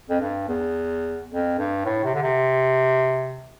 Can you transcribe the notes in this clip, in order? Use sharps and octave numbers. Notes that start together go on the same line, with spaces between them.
F2
G2
E2
F2
G2
A2
C3
D3
C3